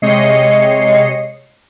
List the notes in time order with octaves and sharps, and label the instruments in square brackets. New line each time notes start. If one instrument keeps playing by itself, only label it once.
[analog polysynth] C3 G#3 C#5 D#5 C7 C#7